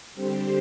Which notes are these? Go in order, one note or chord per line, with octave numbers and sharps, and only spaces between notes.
D3 G3 C4 G4 C5